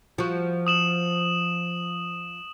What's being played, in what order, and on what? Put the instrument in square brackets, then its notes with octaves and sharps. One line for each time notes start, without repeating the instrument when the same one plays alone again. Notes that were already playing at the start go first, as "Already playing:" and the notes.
[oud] F3 F#4
[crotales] D#6 E7 F#7